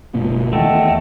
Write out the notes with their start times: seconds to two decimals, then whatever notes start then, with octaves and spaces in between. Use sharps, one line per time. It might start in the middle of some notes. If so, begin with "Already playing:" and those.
0.15 F#1 B2 G#3 A#3
0.53 D#2 E3 A3 D#5 F#5 G5